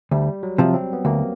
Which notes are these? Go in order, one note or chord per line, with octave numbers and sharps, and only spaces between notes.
D2 G3
F#3
C3 F3
C4
B3
D2 A#3